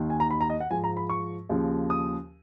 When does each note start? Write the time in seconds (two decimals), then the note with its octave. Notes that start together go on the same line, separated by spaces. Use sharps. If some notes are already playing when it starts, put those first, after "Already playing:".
Already playing: D#2 D#3
0.10 G#5
0.20 A#5
0.31 B5
0.41 A#5
0.50 D#5
0.60 F#5
0.70 G#2 F3 G#5
0.84 A#5
0.97 B5
1.10 C#6
1.49 D#2 C#3 F3
1.90 D#6